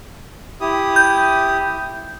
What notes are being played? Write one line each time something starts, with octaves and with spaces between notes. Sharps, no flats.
E4 G4 D#6
G6